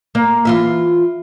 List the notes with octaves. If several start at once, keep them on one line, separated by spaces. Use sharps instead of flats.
A#3
E3 F4 E5